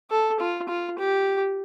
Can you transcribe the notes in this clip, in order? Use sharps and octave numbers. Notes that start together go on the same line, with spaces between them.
A4
F4
F4
G4